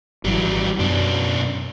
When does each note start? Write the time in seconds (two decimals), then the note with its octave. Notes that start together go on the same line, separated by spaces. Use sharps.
0.25 G#1 E3 F#3 G3
0.79 F#2 B2 D4